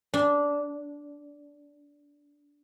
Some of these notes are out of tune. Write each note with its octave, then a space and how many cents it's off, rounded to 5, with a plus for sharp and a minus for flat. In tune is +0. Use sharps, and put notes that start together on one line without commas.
D4 -15